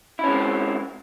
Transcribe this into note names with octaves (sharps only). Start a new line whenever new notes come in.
G#3 C4 C#4 E4